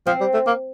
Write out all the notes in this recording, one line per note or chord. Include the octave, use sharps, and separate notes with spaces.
F3 C4
G3
A3
A#3